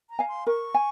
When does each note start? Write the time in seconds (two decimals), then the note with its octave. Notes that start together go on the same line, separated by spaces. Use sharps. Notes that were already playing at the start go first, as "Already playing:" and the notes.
0.10 A#5
0.19 F5 G#5
0.28 C6
0.47 A#4 C#6
0.75 G#5